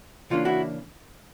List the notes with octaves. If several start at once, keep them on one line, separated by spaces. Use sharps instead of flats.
C#3 E3 G3 A#3 D4 F4
E4 F#4